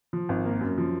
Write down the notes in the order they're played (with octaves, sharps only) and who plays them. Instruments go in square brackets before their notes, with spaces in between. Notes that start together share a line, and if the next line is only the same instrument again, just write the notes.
[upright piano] F3
G#1
A#3
F#2
F3